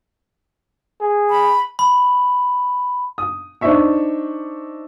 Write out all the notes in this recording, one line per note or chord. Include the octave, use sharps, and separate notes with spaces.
G#4
B5
B5
D#6
D4 D#4 C5 D#5 E5 C#6